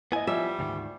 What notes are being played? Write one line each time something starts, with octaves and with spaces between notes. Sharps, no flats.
B3 E4 D#5 G#5
F3 G3 E5
D2 G#2 D#3